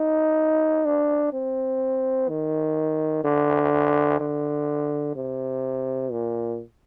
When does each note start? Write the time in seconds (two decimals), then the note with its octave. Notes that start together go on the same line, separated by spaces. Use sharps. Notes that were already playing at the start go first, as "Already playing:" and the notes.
Already playing: D#4
0.85 D4
1.33 C4
2.29 D#3
3.24 D3
4.20 D3
5.16 C3
6.11 A#2